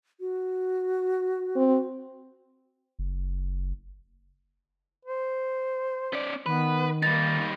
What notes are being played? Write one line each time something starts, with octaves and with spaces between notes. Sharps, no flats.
F#4
C4
F#1
C5
C#4 D5
D#3 B3 B4
G3 A#3 D#4 A6